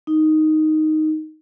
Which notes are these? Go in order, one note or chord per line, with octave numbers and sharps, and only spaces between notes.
D#4